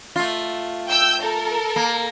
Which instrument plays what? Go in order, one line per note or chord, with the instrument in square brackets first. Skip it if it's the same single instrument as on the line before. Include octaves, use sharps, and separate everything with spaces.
[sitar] A3 F4
[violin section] G5 E6 G6
A4 A#4
[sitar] A#3